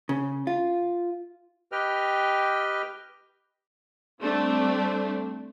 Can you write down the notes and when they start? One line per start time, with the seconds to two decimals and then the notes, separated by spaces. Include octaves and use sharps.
0.09 C#3
0.47 F4
1.72 G4 B4 D#5 G5 F6
4.21 G3 A3 C4 D4